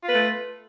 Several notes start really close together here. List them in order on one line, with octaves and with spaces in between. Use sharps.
F4 B4 A3